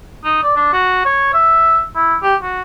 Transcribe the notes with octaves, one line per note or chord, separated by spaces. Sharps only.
D#4
D5
D4
F#4
C#5
E5
E4
G4
F#4